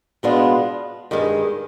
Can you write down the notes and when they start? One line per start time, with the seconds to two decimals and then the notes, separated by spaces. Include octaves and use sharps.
0.23 B2 G#3 B3 D4 F4
1.11 G2 D#3 G#3